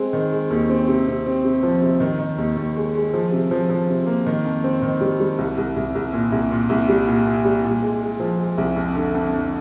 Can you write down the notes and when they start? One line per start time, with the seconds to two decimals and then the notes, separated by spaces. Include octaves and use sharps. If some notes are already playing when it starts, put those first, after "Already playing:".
Already playing: G#3 C4
0.13 D#3
0.32 G#3
0.50 D#2
0.69 C4
0.88 C3
1.07 C3
1.26 C4
1.44 C3
1.63 F3
1.82 C3
2.00 D#3
2.19 D#3
2.38 D#2
2.57 D#2
2.76 G#3
2.95 G#3
3.13 F3
3.32 C3
3.51 F3
3.70 F3
3.88 C3
4.06 A#3
4.26 D#3
4.45 F2
4.64 C4
4.82 D#3
5.01 G3
5.20 G3
5.38 C2
5.58 C2
5.76 C2
5.95 C2
6.13 A#2
6.32 C2
6.51 A#2
6.69 C2
6.89 G3
7.08 A#2
7.26 A#2
7.45 G3
7.64 A#2
7.82 G#3
8.01 G#3
8.20 F3
8.39 G#3
8.58 C2
8.76 F2
8.95 D3
9.14 F2
9.33 F2